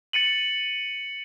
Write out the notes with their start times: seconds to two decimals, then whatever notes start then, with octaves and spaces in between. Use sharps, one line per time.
0.13 A6 C#7 D#7 F#7